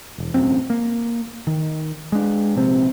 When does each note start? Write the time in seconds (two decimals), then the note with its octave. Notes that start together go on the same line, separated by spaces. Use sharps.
0.18 E1
0.34 E1 A1 F#2 C4
0.70 A#3
1.47 D#3
2.12 G#3 D4
2.56 A#1 C3 C4